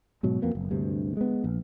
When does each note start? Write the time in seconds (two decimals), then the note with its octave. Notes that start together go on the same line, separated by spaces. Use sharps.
0.23 G#2 B2 F#3
0.42 F2 A#3 B3
0.55 F#1
0.71 D2 G2 C3
1.17 G#3 B3
1.44 A#1